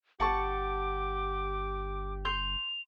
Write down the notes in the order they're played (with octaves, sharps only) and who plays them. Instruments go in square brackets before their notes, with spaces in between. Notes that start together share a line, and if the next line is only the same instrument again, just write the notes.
[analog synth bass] G1 [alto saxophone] G4 [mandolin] F#5 A5 C#6 [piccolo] D6
[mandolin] C6 G6 [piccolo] F7